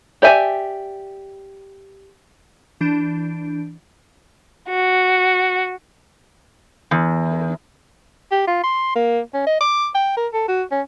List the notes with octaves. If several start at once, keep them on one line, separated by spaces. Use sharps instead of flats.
G4 D5 E5 G#5
E3 D4 A5 G6 D7
F#4
E2
G4
F4
C6
A#3
C#4
D#5
D6
G5
A#4
A4
F#4
C#4